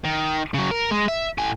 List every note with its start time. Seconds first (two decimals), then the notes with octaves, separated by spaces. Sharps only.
0.05 D#3
0.54 C#3 F#3
0.71 A#4
0.91 G#3
1.08 E5
1.38 A2 G#5